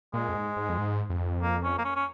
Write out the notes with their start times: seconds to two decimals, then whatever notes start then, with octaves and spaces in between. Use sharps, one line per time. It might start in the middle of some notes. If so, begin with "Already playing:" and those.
0.14 A#2 G#3
0.29 F2
0.35 G#2
0.57 G#2
0.69 F2
0.78 G#2
1.10 F2
1.42 A#3
1.63 C#4
1.78 A#3
1.84 C#4
1.95 C#4